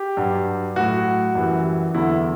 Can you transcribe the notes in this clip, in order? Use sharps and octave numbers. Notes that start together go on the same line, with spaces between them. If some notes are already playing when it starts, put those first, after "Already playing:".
Already playing: G4
G2 F#3
A2 F#3 F#4
F#2 E3 G3
E2 D3 F#3 E4